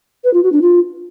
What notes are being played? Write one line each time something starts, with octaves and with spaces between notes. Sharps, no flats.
B4
F4
F#4
D4
F4